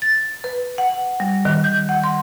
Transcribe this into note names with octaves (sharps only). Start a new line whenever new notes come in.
A6
B4
F#5
G3
D#3
G6
F#5
C6